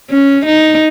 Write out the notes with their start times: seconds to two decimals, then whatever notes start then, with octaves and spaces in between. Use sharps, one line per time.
0.11 C#4
0.46 D#4